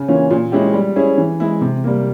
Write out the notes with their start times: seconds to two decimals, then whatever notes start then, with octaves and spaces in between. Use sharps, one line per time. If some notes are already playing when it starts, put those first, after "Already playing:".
Already playing: C#3
0.08 E3 A#3 C#4 F4
0.31 A#2
0.52 G#3 C#4 E4 G4
0.74 G3
0.96 C#4 E4 G#4
1.18 E3
1.40 G#3 E4
1.61 C3
1.84 G3 A#3